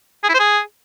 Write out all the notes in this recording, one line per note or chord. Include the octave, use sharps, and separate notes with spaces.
G#4
E4
C5
G#4